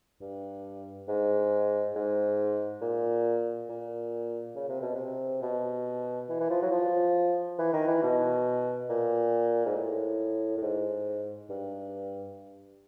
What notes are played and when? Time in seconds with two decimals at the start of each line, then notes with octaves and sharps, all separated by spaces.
0.21 G2
1.08 G#2
1.96 G#2
2.81 A#2
3.69 A#2
4.55 C#3
4.69 C3
4.81 B2
4.95 C3
5.42 B2
6.29 E3
6.40 E3
6.50 F3
6.62 F#3
6.72 F3
7.58 E3
7.73 D#3
7.87 E3
8.03 B2
8.89 A#2
9.66 G#2
9.76 A2
10.57 A2
10.62 G#2
11.49 G2